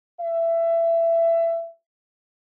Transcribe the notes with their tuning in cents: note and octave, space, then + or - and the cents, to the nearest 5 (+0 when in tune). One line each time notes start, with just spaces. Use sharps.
E5 +20